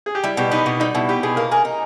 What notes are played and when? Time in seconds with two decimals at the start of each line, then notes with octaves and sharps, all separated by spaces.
0.06 G#4
0.15 G4
0.24 G3 E4
0.37 B2 G4
0.51 B3 D#4
0.66 B2
0.80 G3 D#4
0.95 B2 E4
1.09 B3 G4
1.23 B2 G#4
1.36 A#3 A#4
1.52 G#4 A#4
1.65 D#4